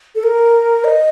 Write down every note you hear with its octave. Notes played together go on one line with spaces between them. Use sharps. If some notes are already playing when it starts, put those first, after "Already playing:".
A4
A#4
D#5